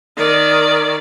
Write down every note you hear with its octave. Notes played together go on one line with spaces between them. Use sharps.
D#3 D5